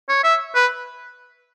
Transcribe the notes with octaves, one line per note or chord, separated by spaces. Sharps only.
C#5
E5
B4